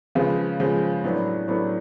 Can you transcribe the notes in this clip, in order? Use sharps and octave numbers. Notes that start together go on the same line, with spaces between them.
C#3 F3 G#3 B3
C#3 F3 G#3 B3
A2 F#3 B3 D4
A2 F#3 B3 D4